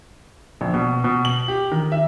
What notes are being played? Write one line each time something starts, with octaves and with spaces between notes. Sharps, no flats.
A#1
B2
B2
F#7
G4
D#3
E5